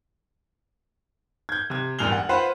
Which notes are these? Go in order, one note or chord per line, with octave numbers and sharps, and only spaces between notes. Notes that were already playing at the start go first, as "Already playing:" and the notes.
G6 G#6
C3 G#6
E1 G2 A#2 F6 F7 G7
F#5
F4 B4 C5 F#5 B5